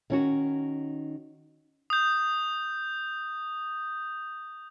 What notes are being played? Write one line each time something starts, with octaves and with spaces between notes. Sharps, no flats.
D#3 C#4 F#4
D#6 G6